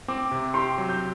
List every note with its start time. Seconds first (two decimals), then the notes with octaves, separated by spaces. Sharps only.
0.08 C4 D6
0.31 C3
0.54 G4 C6
0.78 F#3
0.89 G6